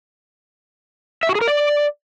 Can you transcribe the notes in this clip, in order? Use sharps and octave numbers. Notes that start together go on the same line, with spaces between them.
E5
F#4
G#4
A#4
D5